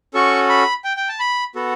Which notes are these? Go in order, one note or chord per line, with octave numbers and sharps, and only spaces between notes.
C#4 F#4 A4 C#6
B5
G5
G5
A5
B5
B3 F#4 A4